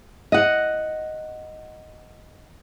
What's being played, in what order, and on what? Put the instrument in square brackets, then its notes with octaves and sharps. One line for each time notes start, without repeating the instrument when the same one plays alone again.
[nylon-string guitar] D#5 F#5